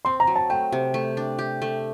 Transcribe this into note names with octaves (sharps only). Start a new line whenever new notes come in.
C4 C6
A#5
F#3
A5
A3 G5
C3
A3
D4
G4
A3